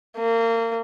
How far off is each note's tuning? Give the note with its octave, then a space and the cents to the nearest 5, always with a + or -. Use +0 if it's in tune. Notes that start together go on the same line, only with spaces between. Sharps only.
A#3 -30